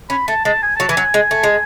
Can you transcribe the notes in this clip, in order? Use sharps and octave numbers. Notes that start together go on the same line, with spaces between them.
C#4 B5
A3 A5
G#3 A5
G#5
F#3 A5
E3 G#5
F#3
G#3
A3
G#3